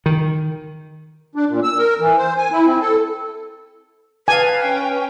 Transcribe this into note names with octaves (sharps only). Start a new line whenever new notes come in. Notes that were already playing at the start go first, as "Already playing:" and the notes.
D#3
D4
A#2
E6
A#4
E3
C5
G#5
E4
C4
A4
B4 F5 G#5 A5
C#4 G5